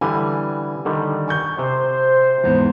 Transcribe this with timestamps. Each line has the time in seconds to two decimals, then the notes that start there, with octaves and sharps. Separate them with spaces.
0.01 D3 E3 G3 G#5
0.85 D3 D#3 G3
1.28 G#5 C#6 G6
1.59 C3 C5
2.44 E2 G#2 B3